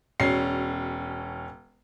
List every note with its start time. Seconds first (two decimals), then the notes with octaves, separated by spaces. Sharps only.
0.20 E1 C#4 C7